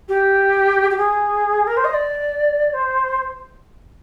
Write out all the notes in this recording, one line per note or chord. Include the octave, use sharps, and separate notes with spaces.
G4
G4
G#4
A#4
C5
D#5
D5
C5